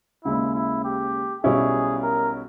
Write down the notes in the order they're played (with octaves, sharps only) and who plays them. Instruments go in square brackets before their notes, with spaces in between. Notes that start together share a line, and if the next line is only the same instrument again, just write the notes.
[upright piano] D#2 C#3 G#3 [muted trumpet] E4
[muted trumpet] E4
G4
[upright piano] B1 B2 G3 C#4 E4 [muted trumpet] G#4
[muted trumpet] A#4